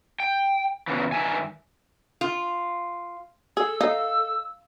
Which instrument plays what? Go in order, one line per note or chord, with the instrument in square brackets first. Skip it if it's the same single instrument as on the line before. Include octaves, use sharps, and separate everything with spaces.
[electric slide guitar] G5
E2 A#2 C#3 E3
G2 D#3 E5 G#5
[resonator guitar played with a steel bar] F4
[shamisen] G#4 [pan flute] A4 [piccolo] E6
[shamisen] D#4 [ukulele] F5